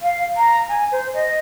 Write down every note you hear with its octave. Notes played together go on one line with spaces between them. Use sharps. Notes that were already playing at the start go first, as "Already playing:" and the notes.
F5
A#5
G#5
C5
D#5